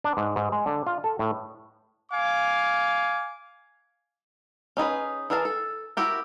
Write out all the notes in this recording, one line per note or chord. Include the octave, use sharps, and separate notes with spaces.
D4
G#2
G#2
G#3
D3
F4
A4
A2
F5 G#5 D6
C#4 D#4 G#4 B4
E3 G#4 A#4 F5 A5
A4
E4 F#4 G4 A#4